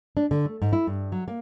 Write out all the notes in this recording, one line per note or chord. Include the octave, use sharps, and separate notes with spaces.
D4
D3
A3
G#2
E4
G2
F#3
A#3